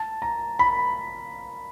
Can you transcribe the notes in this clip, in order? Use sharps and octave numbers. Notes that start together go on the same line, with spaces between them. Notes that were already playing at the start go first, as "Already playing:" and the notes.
Already playing: A5
A#5
B5